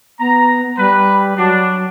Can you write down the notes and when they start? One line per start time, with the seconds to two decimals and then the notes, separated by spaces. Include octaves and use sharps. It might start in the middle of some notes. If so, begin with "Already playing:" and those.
0.20 B3 A#5
0.78 G3 B4
1.38 F#3 D4